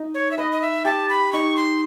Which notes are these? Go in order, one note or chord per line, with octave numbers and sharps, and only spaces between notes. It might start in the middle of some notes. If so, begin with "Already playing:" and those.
Already playing: D#4
C#5
E5
B4 D#5
D#5
E5
G4 A5
B5
D#4 C#6
C6